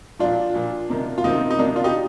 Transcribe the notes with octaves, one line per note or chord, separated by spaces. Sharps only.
A#2 F3 D4 F4
A#2 F3
C3 D#3
F4
C3 D#3 C4 D#4
D#4
C3 D#3 A#3 D4
D4 F4
D#4 G4